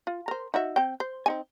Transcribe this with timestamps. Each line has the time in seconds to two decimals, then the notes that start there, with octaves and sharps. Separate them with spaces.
0.07 F4
0.28 A#4 C5
0.54 D#4 F#4 E5
0.76 C4 G5
1.00 C5
1.26 C4 D#4 G#5